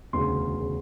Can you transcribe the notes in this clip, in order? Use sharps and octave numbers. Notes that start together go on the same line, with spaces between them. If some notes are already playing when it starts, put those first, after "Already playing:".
E1 D2 C#3 C6
C#3